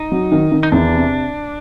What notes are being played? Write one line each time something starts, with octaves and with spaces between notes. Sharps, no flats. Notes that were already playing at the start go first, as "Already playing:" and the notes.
Already playing: D#4
F#3
D#3
D#3
D#4
E2 D4
C3